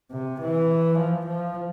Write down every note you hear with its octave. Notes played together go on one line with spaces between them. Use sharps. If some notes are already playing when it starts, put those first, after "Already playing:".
C3
E3
F3
F3